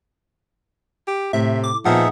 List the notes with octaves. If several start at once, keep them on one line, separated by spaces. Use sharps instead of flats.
G4
A2 C3 E5
D6
A#2 F3 B3 D#4 G#4 E5 F#5